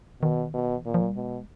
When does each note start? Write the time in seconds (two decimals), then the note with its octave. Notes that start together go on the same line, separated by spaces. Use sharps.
0.22 B2 D#3
0.54 B2
0.77 E3
0.85 A#2 D#3
0.94 F3
1.01 F#3
1.09 G3
1.16 B2 G#3